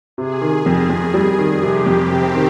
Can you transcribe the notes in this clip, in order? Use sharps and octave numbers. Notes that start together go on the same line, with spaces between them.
C3 G#4
D#3
F2
F2
G3
D#3
C3 G4
F2
C4
C3
D#3